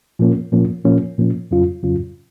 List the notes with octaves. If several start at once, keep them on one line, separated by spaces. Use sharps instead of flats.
A#2 F3 A#3 C#4
A#2 F3 A#3 C#4
A#2 F3 A#3 C#4
A#2 F3 A#3 C#4
F2 C#3 F#3 C#4 F4
F2 C#3 F#3 C#4 F4